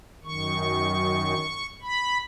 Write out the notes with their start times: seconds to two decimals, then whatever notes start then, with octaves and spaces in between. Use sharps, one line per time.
0.24 F#2 D#3 C#6
1.82 B5